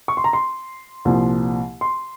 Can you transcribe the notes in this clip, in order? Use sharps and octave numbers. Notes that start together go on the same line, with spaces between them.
C#6
C6
A#5
C6
C2 A#2 F3
C6